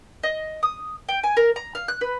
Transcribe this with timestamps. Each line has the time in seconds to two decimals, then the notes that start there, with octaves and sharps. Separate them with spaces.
0.23 D#5
0.63 D#6
1.09 G5
1.24 G#5
1.37 A#4
1.56 A#5
1.75 F5
1.88 F#6
2.01 B4